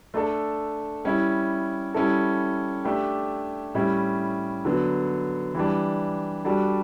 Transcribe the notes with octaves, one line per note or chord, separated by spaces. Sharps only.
A3 D4 A4
G3 C#4 E4
G3 C#4 E4 A4
A3 D4 G4
A2 G3 C#4 E4
D3 F#3 B3
E3 G3 D4
G3 D4 F#4 A4